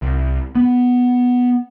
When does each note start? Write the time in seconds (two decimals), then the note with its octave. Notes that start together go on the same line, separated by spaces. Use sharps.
0.02 C2
0.55 B3